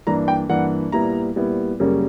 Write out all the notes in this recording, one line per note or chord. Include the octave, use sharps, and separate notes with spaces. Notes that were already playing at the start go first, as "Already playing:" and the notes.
G2 E3 A#3 D4 A#5
G5
G2 E3 A#3 D4 F#5
A#2 G3 B3 E4 A#5
A#2 G3 B3 E4
F#2 C#3 G3 A#3 C#4